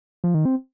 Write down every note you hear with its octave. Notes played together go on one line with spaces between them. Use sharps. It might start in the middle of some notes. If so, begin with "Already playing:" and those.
F3
D#3
C4